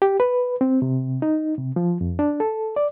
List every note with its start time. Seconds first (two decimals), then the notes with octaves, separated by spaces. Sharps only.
0.02 G4
0.20 B4
0.61 C4
0.82 C3
1.22 D#4
1.58 C3
1.76 F3
2.01 F2
2.19 D4
2.40 A4
2.76 D5